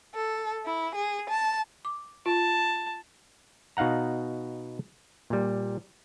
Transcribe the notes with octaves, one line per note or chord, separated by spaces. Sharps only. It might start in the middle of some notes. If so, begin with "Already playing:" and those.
A4
E4
G#4
A5
D6
F4 A5
B2 D#4 F5 F#5 A#5
A#2 G3